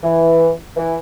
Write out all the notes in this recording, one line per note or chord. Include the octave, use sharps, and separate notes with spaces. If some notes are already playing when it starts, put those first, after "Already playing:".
E3
E3